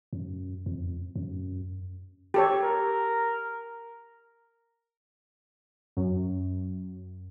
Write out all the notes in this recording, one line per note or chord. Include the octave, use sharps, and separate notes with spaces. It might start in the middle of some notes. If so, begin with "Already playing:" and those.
F#2
F2
F#2
G4 A4 C#5
A#4
F#2